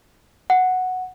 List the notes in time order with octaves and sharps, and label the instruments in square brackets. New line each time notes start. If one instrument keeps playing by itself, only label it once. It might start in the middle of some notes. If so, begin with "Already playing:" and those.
[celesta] F#5